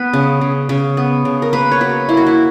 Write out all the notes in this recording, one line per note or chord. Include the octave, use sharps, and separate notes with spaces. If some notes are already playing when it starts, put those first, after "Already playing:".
Already playing: B3 B4
C#3
C#3
C#3
B3
C#3
A#4
A#3 B4
C#5
F#3 B4
A#3 E4
F#4
E4